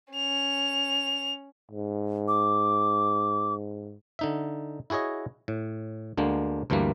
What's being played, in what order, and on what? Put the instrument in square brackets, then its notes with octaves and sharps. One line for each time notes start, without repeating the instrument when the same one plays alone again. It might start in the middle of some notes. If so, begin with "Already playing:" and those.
[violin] C#4 F7
[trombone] G#2
[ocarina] D6
[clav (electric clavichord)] D3 D#4 E5
E4 F#4 G#4 C#5 D#5
A2
D2 D3 G#3 A#3
D2 G2 E3 G3 A#3